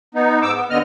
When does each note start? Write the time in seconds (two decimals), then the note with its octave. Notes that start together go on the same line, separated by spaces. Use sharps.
0.15 B3 D#4
0.42 G#2 D6 E6
0.56 B3
0.70 D#2 D3 B3 D#5 F6